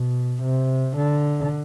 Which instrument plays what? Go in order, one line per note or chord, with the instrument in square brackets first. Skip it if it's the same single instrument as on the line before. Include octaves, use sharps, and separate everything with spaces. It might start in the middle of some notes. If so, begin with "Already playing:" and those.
Already playing: [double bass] B2
C3
D3